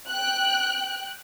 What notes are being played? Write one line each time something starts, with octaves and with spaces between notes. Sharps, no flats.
G5 F#6